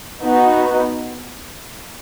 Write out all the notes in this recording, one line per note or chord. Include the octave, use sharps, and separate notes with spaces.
B3 D#4 F#4